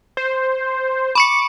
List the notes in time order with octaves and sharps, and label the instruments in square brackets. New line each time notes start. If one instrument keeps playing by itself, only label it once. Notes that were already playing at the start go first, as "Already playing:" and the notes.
[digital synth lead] C5
[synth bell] B5 C#6 C#7 [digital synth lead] D6